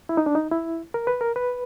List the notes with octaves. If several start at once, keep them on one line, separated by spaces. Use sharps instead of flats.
E4
D#4
D4
D#4
E4
A#4
B4
A#4
B4